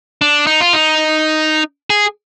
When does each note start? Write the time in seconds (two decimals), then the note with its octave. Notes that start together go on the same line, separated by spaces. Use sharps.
0.21 D4
0.47 D#4
0.60 F4
0.73 D#4
1.90 G#4